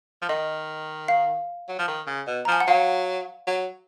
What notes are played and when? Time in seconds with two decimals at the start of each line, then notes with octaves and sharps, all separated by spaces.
0.22 F3
0.29 D#3 D#5
1.08 F5
1.69 F#3
1.79 F3
1.88 D#3
2.07 C#3
2.27 B2
2.45 A#5
2.48 F3 G#5
2.60 F#5
2.67 F#3 F5
3.47 F#3